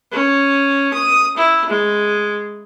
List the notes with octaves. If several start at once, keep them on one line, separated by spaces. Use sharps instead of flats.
C#4
D#6
E4
G#3